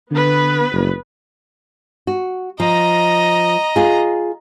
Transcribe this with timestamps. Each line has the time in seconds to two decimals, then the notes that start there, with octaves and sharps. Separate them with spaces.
0.12 D3 B3 B4
0.73 F#1
2.07 F#4
2.60 F3 D#5 A#5
3.76 F4 G#4